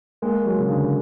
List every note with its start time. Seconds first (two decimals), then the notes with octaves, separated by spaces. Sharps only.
0.22 G#3 A#3
0.45 F#3 G#3
0.59 C#3
0.69 D3